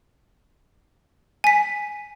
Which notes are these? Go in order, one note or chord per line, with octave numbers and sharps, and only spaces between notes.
G#5 B6